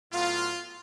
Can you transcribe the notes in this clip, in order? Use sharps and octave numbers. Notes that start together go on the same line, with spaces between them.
A2 F#3 B3 F4